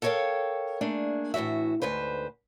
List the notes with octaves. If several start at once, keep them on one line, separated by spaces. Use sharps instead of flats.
A4 A#4 C#5 D5 F5 G5
A3 A#3 D4 G#4
A2 E3 G#3 F#4 E5
D2 G#2 B4 C5